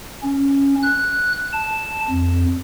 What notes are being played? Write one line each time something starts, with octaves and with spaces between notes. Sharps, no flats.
C#4
F#6
A5
F2